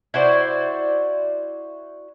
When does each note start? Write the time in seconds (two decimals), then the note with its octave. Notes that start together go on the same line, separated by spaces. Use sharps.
0.14 E4 F#4 C5 D5